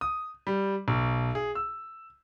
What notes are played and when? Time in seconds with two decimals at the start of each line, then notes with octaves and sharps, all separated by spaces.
0.01 D#6
0.47 G3
0.88 B1
1.35 G#4
1.55 E6